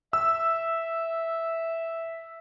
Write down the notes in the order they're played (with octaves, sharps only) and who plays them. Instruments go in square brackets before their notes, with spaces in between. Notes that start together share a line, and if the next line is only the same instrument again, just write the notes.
[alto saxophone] E5 [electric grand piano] E6